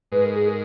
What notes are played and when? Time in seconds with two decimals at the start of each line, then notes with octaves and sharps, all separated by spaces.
0.12 G#2 B4
0.24 A#4
0.36 G#4
0.48 A#4